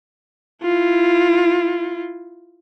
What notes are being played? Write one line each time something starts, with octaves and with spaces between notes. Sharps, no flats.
E4 F4